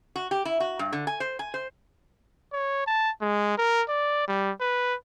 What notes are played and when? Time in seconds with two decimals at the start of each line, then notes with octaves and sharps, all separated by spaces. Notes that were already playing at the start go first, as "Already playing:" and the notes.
0.16 F#4
0.31 G4
0.45 E4
0.60 F#4
0.79 G2
0.93 D3
1.07 G#5
1.20 C5
1.39 G#5
1.54 C5
2.53 C#5
2.87 A5
3.22 G#3
3.58 A#4
3.89 D5
4.28 G3
4.61 B4